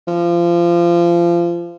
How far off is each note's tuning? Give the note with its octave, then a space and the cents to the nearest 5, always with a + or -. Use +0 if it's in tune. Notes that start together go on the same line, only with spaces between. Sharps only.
F3 -25